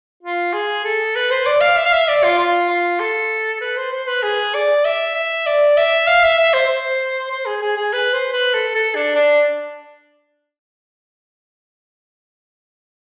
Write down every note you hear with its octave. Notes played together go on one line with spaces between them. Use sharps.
F4
G#4
A4
B4
C5
D5
F5
E5
F5
E5
D5
F4
F4
F4
A4
B4
C5
C5
B4
G#4
D5
E5
E5
D5
E5
F5
E5
E5
C5
C5
C5
G#4
G#4
G#4
B4
C5
B4
A4
A4
D4
D4